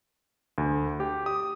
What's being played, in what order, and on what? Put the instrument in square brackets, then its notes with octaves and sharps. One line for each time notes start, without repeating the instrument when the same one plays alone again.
[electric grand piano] D2
G4
D#6